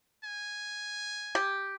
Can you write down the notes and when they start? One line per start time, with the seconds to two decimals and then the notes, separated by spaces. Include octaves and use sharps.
0.24 G#5
1.35 G4